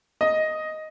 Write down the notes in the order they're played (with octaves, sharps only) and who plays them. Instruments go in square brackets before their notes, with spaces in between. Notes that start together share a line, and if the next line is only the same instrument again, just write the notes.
[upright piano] D#5